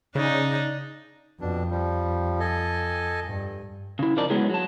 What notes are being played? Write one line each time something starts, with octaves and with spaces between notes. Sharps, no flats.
C#3 D4 D#4
F2 B2 D4
F3 G3
A4 D#5 G#5
G2
C#3 E4
F2 F3 D#4 A#4 D5 A5
F#3 G#3 B3 C#4 E4 G#4
F#3 A5